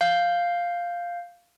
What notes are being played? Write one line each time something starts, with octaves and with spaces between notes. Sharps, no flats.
F5 G6